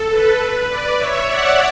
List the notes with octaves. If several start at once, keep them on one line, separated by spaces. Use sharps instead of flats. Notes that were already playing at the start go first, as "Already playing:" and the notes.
Already playing: A4
B4
B4 D5
C#5 E5
D5 F#5